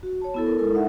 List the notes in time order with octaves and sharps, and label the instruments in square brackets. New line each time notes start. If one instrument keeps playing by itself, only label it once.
[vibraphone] F#4
C#5 A5
B3 E4 A4
A#4
G#3 E4 A4 A#4
D#4 E5 F#5